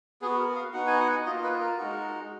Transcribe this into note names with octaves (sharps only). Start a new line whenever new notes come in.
B3 F#4 G#4
A#4
F5
B3 D#4 F#4 F#5
G#5
F#5
A#3 F4 D#5
B4
A#4
G#3 D#4 F#4